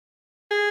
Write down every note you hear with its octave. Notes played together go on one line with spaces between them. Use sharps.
G#4